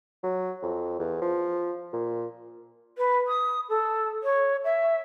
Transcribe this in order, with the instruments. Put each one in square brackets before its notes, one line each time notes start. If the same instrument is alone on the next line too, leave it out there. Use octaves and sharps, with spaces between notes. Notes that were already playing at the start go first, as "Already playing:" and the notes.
[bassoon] F#3
F2
E2
F3
A#2
[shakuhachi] B4
D#6
A4
C#5
E5